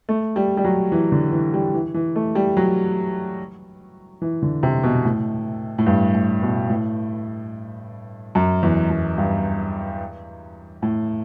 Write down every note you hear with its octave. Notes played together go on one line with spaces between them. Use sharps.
A3
G3
G3
F#3
E3
D3
E3
G3
E3
E3
A3
G3
F#3
E3
D3
C3
B2
A2
A2
G2
A2
B2
A2
F#2
E2
F#2
G2
A2